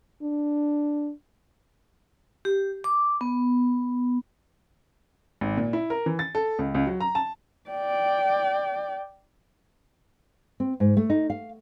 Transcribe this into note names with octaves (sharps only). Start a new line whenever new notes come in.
D4
G4
D6
B3
G#1
A#2
E4
A#4
E3
A6
A4
C#2
C#2
F#3
A#5
A5
D5 G5
C4
G#2
A3
D#4
F5